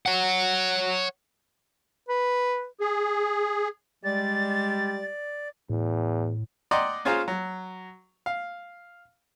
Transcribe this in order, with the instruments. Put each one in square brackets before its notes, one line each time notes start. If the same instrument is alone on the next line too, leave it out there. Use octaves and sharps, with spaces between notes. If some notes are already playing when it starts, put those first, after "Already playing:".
[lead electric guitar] C#5 F#5
[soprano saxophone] B4
[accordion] G#4
[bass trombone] G3 [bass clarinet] G#3 [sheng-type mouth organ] D5 [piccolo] A6
[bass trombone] E2 [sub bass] A2
[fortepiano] D5 D#5 F#5 G5 A#5 C6
C#4 F4 G#4 C5 F5 A#5
F#3
F5